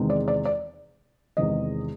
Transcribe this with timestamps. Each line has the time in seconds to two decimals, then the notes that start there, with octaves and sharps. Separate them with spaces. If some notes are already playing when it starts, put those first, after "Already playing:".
Already playing: E2 C3 D#3 G#3
0.10 D5
0.28 D5
0.45 D5
1.37 E2 C3 D#3 G#3 D#5